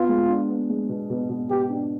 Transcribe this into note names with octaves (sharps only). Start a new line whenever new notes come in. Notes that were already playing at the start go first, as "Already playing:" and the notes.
Already playing: B3 F4
G#3
D4
B3
G#3
B2
B2
B2
B2 G4
D4